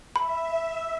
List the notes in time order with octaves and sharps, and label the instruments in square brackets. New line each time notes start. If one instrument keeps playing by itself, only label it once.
[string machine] E5 [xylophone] B5